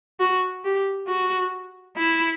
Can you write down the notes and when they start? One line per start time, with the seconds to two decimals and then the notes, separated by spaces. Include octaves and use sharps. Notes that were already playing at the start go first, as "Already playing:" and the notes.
0.20 F#4
0.65 G4
1.08 F#4
1.97 E4